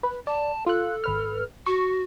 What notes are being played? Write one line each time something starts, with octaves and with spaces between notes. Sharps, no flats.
B4
D5 A5
F4 A4 F#6
G#1 B4 F6
F#4 C#6